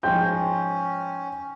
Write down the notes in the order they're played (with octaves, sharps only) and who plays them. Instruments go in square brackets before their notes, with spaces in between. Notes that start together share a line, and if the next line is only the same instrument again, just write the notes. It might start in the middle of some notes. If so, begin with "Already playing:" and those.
[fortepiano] G#2 F3 [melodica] C#4 [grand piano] G5 C6 G6